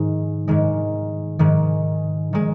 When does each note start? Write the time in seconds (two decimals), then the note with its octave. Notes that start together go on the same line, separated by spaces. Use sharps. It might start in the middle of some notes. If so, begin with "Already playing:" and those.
Already playing: G#2 D#3 G#3
0.48 G#2 D#3 G#3
1.39 G#2 D#3 G#3
2.33 D#3 G#3